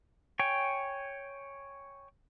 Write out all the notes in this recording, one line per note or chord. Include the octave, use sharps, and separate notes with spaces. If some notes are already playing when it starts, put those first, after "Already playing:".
C#5 G5 G#5